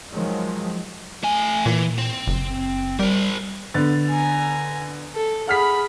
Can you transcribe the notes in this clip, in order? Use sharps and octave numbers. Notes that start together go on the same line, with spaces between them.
D#3 F3 F#3 G#3
A3 G#5
A#2 E3
C4
F#1
G3 A#4 C5
D3 B3 A6
G#5 A#5
A4
G#4 F#5 B5 F6 B6